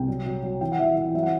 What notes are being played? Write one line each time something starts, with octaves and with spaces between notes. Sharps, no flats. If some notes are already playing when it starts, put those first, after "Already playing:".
Already playing: C2 G5
F#3
F#3
F#3
E3 G5
F#5
E3 E5
E3 E5
F#3 E5
F#5